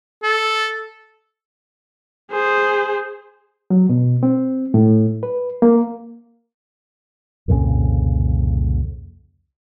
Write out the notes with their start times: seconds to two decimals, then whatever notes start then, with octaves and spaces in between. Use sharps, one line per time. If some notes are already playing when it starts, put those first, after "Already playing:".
0.23 A4
2.31 G#4 C5
3.70 F#3
3.89 B2
4.23 C4
4.74 A2
5.23 B4
5.62 A#3
7.48 C2 F2 A#2 C#3